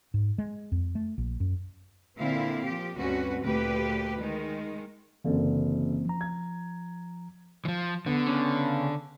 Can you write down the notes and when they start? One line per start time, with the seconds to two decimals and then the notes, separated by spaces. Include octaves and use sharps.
0.14 G#2
0.38 G#3
0.72 F2
0.95 A3
1.18 A#1
1.40 F#2
2.17 A#2 D3 C4 E4 F5
2.64 F3 G4
2.97 D2 G2 C4 C#4 F#4 B4
3.41 D2 A#2 G4 B4
4.20 D#3 G#3 D#4
5.24 F#1 F#2 D3 E3 A#3 C4
6.05 F3 A#5
6.21 G#6
7.65 E3 F3
8.06 D3 B3
8.27 C#3